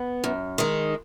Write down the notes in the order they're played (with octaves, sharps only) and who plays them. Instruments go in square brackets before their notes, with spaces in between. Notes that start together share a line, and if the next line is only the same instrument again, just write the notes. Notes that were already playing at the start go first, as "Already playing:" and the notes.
Already playing: [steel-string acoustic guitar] B3
F#2
D#3 G#3